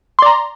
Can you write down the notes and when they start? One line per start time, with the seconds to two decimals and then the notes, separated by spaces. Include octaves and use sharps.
0.19 C6
0.22 D5
0.26 A#5